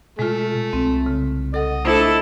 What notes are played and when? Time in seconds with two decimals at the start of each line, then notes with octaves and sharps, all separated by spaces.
0.19 B2 G#3 A3 F4
0.73 C2 C4
1.06 C#3
1.54 A4 D#5 F#5
1.85 A3 D4 E4 A4 C5